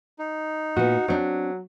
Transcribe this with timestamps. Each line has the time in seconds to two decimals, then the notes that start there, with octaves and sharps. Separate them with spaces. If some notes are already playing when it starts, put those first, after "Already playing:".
0.19 D#4
0.76 A#2 B3 F#4
1.08 F#3 C4 D4